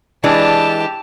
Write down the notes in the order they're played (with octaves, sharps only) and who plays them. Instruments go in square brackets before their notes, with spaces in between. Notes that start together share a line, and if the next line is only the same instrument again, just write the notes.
[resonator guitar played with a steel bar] E3 G#3 D4 [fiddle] G4 A5